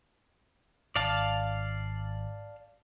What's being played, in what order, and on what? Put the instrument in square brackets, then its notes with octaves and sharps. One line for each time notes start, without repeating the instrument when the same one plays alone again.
[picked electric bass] G#1 [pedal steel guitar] D5 F5 A5